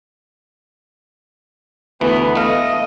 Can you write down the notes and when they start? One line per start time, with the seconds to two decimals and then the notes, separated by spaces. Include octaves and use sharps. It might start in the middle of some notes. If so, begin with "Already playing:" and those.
2.01 D2 E3 B3
2.35 A3 D#5 F5